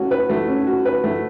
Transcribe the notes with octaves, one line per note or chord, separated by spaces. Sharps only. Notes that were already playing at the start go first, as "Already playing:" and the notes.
Already playing: A3 C#4 F#4
B4
A3
C#4
F#4
B4
A3